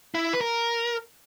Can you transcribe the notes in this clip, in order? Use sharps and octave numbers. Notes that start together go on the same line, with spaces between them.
E4
B4
A#4